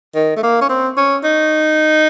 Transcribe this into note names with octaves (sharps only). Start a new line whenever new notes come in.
D#3
A3
A#3
C#4
C4
C#4
D#4